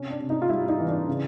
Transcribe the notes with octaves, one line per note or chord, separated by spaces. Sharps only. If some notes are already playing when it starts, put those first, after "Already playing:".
Already playing: C3 C#4
D4
C3
D#4
F4
G3 E4
D#4
E3
D4
C#3